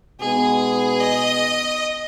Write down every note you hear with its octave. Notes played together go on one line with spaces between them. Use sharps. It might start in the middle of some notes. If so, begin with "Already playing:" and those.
B2 G#3 B3 D#4 G#4
D#5